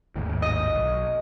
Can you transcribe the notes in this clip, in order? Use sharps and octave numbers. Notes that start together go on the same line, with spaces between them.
G#1 D#2 A2
D#5
B1